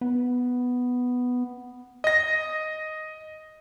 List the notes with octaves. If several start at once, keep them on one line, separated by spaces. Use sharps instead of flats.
B3
D#5 A#6